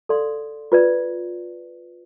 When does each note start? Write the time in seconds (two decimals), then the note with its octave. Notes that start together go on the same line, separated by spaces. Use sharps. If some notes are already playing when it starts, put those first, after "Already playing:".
0.09 A4 D5 F5 C6
0.72 F4 B4 D5